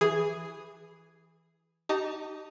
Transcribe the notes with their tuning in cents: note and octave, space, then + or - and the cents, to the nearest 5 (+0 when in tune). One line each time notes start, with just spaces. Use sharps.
E3 +0 G#4 +0
D#4 +0 G4 -35 A5 +30